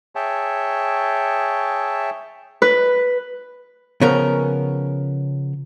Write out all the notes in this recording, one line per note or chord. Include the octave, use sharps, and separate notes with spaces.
G#4 C#5 E5 G5 A5
B4
C#3 F3 B3 C#4 A#4